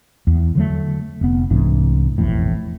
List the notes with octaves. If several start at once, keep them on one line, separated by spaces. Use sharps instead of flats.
E2
D3 F#3 A3
F1 B3
C2 G#2 E3 D4
E1 A1 F2 A2